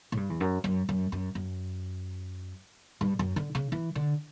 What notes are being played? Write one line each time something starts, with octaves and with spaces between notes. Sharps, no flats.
A2
G2
E2
F#2
F#2
F#2
F#2
F#2
G2
F#2
D3
C#3
E3
D3